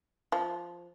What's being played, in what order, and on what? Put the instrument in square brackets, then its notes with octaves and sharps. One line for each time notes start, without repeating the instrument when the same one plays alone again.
[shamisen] F3